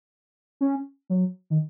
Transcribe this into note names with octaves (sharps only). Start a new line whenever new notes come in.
C#4
F#3
D#3